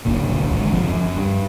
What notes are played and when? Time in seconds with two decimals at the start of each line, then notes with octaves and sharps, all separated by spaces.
0.05 F#1 D2 A#2
0.25 D1 B1 D3
0.51 G#1 G#2 D3
0.72 F1 F3 C4
0.89 F#2
1.16 G2